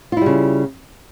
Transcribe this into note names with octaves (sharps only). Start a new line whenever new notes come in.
C#3 G3 E4 F4